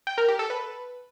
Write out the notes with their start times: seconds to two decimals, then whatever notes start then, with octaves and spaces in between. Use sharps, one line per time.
0.07 G5
0.18 A#4
0.28 G4
0.39 A4
0.50 B4